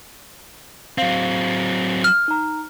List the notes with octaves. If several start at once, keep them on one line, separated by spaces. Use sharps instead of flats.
F#3 C4 F5
F6
D#4 A#5